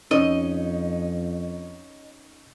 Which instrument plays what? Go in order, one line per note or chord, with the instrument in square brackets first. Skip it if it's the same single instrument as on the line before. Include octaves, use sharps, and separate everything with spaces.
[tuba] F2 [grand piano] C#4 D#4 [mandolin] D#5